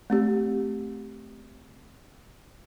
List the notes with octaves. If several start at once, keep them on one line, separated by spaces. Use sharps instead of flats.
A3 C4 G4